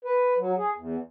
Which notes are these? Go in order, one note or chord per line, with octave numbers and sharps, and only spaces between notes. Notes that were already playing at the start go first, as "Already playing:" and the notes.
B4
F#3
G#4
E2